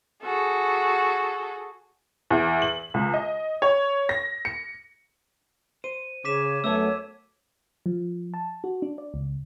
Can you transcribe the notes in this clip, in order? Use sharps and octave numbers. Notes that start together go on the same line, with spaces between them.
F#4 G#4 A4
E2
F#7
C#2
D#5
C#5
A#6
C#7
C5 D#7
C#3 C#5 D6 B6 E7
F#2 A3 B3 A4 C#5 E5 E6
F3
A5
F#4
D4
D5
C#2